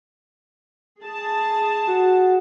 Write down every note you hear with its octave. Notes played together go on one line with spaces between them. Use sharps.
G#4 A5
F#4